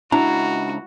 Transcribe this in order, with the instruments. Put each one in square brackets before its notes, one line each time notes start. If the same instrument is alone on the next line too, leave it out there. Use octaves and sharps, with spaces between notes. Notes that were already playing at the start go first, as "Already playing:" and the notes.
[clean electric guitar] C#2 A#5 [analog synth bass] D4 [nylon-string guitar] E4 [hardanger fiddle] F#4